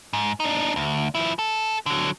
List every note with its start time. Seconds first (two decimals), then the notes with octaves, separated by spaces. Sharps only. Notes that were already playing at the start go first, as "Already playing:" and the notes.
0.13 G#2
0.40 D4 D#4
0.76 D2
1.15 F3 E4
1.39 A4
1.86 D3 F#3